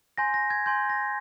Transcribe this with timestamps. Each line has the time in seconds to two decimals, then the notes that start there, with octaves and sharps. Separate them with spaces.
0.18 G#5 C6 G6 A#6
0.34 A#6
0.50 G#6
0.66 G#5 C6 G6 G#6
0.90 A#6